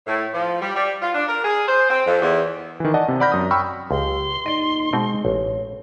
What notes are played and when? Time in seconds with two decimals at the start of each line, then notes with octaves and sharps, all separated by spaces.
0.07 A2
0.34 F3
0.61 G3
0.75 G3
1.02 F4
1.15 D4
1.29 A#4
1.45 G#4
1.67 C5
1.89 C4
2.07 F2
2.21 E2
2.80 D#3 E3
2.94 D5 D#5 F#5 A5
3.08 C3
3.20 D5 F#5 B5 F6 G6 A#6
3.32 F#2 D#6
3.51 G5 B5 C#6 E6 F6
3.91 C#2 G4 C6
4.46 D#2 A#2 D#4 D5 D#5
4.93 B2 G#3 C4 D#4
5.25 A1 C#5